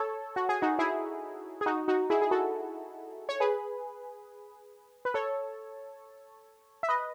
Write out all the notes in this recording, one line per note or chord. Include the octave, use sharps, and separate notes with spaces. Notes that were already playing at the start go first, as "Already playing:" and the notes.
Already playing: A4 C#5
F#4
G#4
D#4 F#4
E4 G#4
G#4
D#4 F#4
D#4 F#4
E4 G#4
G#4
F#4 A4
C#5
G#4 B4
B4
A4 C#5
E5
B4 D#5